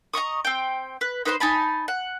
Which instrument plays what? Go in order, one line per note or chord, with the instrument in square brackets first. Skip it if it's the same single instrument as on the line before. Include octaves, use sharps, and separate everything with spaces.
[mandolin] D#5 A#5 C#6 D#6
C4 G5
B4
D#4 B4 C5 C6
D#4 G#5 A5 B5
F#5